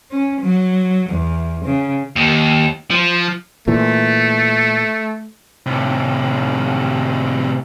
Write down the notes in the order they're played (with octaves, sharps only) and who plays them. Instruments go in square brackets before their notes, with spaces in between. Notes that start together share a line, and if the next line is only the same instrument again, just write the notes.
[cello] C#4
F#3
E2
C#3
[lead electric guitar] D#2
F3
[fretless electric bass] A#2 E3 [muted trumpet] A3
[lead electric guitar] A2 C3